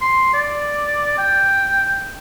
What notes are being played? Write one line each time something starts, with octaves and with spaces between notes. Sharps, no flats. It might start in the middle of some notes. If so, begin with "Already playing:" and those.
C6
D5
G5